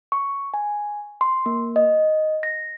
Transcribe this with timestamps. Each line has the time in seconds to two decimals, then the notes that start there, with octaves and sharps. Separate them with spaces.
0.12 C#6
0.54 G#5
1.21 C6
1.46 A#3
1.76 D#5
2.43 A#6